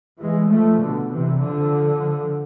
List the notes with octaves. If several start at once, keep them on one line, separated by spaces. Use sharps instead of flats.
E3 G#3
F3 A3
B2 D3
C3 E3
D3 F3